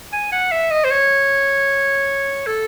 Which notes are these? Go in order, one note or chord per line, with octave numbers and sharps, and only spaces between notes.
G#5
F#5
E5
D#5
C5
C#5
A4